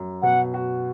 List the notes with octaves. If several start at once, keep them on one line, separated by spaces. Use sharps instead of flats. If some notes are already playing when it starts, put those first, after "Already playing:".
Already playing: F#2
B2 F#5
F#4